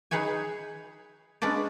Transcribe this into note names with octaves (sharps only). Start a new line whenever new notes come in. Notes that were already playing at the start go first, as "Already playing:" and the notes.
D#4 G#4 B4 C#5 G#5
G#3 C#4 D4 B4 D5